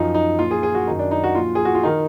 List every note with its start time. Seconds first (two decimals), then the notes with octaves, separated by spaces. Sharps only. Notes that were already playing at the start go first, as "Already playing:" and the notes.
Already playing: F#2 F3 D#4
0.14 D#4
0.39 A#2 F3 F4
0.51 G#4
0.63 G#4
0.75 F#4
0.87 F#2 D#3 D#4
0.99 D4
1.11 D#4
1.24 F#4
1.35 A#2 F3 F4
1.55 G#4
1.65 F#4
1.75 F4
1.83 D#3 D#4